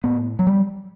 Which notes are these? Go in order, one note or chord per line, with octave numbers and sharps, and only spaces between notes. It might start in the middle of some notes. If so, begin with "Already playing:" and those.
A2 B3
F#3
G3